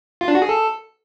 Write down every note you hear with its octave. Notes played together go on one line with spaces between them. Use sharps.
F4
D4
F#4
G#4
A4